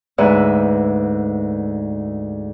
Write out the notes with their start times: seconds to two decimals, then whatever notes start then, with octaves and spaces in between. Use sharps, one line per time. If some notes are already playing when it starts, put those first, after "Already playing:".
0.18 D2 G#2 B4 E5